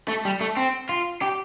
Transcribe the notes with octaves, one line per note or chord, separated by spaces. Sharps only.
A3
G3
A3
C4
F4
G4